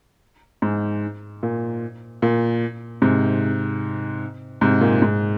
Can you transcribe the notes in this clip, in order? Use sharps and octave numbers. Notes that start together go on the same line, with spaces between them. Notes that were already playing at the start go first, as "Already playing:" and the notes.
G#2
A#2
A#2
G#2 C3
G#2 C3
A#2
G#2